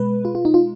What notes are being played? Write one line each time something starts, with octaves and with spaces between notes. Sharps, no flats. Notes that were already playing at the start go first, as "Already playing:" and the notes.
Already playing: B2 G#3 B4
F4
F4
D#4
F4